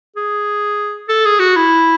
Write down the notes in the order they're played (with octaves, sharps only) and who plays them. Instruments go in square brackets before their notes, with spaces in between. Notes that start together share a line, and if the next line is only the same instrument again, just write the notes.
[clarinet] G#4
A4
G#4
F#4
E4